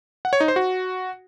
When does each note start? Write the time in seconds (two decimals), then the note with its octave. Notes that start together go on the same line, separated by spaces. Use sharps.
0.25 F#5
0.33 C#5
0.40 D#4
0.48 C5
0.56 F#4